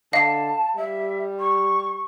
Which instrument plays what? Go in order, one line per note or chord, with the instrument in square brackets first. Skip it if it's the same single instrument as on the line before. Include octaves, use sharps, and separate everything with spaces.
[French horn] D3 [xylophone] D#5 F5 [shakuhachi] A5
[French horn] G3 [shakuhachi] E5
[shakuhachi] C#6